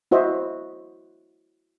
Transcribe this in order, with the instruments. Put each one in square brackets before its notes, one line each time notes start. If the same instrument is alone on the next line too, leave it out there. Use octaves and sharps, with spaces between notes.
[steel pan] E4 F#4 C5 D#5 E5